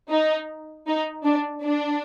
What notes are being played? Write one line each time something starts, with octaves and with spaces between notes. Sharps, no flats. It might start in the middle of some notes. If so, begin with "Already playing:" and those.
D#4
D#4
D4
D4